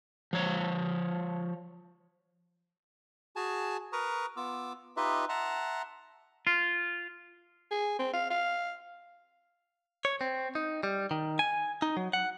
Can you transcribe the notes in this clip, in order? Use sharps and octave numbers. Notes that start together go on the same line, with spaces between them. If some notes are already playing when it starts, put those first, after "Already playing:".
F3 C#5
F#4 G#4 G#5 A5
A#4 B4 A#5 C#6 D#6
B3 F4 D6 E6
D#4 F4 G4 B4 D#5 E5
E5 F#5 A5 A#5 C6
F4
G#4
C4
F5
F5
C#5
C4
D#4
G3
D#3
G#5
D#4
F#3
F#5